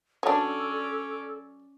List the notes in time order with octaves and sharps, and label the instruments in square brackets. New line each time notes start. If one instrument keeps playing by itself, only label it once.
[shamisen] F#3 D4 [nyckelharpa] C#4 D5 [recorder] A4